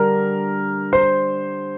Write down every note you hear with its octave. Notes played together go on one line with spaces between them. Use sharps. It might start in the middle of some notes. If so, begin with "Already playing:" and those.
Already playing: D3 G3 D4 A#4 A#5
C5 C6